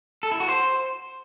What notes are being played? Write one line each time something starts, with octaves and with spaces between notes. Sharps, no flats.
A4
E4
F#4
C5